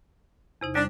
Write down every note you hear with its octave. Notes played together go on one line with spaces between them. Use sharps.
E2 C3 D#4
G3 D4